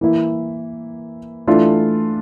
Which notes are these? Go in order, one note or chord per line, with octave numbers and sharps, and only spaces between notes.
E3 A#3 E4
E3 A3 D4 F4 A4